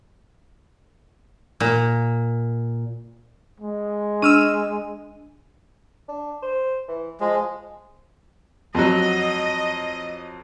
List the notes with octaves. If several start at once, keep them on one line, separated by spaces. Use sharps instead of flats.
A#2
G#3
D4 E6 F6 D#7
D4
C5
E3
F3 G#3
F2 F#3 D#5